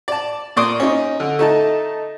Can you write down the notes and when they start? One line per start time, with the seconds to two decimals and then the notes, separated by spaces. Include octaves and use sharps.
0.08 D5 A5
0.56 A#2 D5 C6 D6 D#6
0.80 C#4 D#4
1.20 D3
1.39 A3 D#4 A5